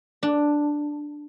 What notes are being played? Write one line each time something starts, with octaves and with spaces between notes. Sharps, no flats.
D4